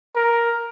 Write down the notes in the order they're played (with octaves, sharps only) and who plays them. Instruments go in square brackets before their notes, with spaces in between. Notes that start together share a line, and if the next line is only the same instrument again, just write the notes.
[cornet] A#4